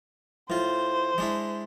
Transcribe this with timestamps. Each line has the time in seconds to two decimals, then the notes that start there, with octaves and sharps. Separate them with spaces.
0.50 A2 F4 C5
1.18 G#3 D4 E4